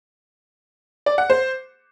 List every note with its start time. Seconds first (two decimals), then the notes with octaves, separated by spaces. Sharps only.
1.06 D5
1.18 F#5
1.30 C5